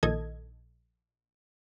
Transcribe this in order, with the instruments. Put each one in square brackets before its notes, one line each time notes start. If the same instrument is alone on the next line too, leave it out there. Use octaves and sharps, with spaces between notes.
[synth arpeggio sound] A#1 D#3 A4 D#5 G#6